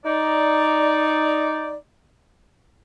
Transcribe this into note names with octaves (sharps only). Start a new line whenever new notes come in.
D#4 D5